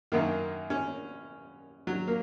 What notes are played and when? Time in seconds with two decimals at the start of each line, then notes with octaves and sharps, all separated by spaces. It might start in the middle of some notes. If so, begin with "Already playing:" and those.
0.12 F#2 D#3 A#3
0.70 C#4
1.87 F#3
2.07 A#3